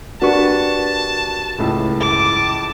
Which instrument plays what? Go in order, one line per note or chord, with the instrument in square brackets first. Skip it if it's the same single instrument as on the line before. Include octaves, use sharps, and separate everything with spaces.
[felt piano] D4 B4 C#6 [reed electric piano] F#4 G4 A#4 [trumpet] A5
[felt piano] C#2 A2
[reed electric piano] G2 [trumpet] A5 [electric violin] D6